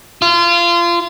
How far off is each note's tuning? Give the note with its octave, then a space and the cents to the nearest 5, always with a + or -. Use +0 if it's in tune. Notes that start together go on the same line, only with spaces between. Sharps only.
F4 -25